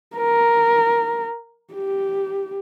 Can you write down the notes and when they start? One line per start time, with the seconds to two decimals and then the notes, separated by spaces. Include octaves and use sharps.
0.16 A#4
1.74 G4